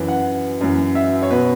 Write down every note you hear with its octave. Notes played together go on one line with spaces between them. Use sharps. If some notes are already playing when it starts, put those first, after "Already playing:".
Already playing: F#2 E3
F#5
F#2 E3
E5
C#5
B2 B4